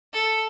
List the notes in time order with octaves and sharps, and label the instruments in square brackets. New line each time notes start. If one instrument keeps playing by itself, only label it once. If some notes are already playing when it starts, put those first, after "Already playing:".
[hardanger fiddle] A4